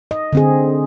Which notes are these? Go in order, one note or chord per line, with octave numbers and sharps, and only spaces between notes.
D#5
D3 C4 G#4